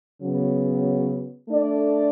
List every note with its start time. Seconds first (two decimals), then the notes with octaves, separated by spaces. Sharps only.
0.20 C#3 F#3 B3
1.49 A3 D4 A4 D5